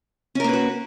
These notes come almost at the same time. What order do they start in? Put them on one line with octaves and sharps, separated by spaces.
C#4 A#4 A#3 B4 F#4